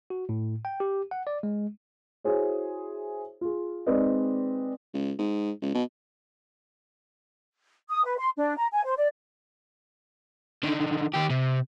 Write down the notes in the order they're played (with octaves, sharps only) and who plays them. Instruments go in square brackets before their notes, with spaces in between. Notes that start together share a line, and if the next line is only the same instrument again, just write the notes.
[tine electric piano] F#4
A2
G5
G4
F#5
D5
G#3
[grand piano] E4 F#4 G#4 C5 C#5
F4 G#4
G#3 C4 D#4 B4 D5 D#5
[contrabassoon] C#2
G#2
C#2
B2
[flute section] D#6
B4
C6
D4
A#5
G#5
C5
D5
[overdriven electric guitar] D3 D#3
D#2 G4
C3